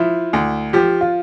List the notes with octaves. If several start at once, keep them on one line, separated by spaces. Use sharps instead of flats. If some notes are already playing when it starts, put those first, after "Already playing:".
Already playing: F3 E4
D2
F3 G4
F4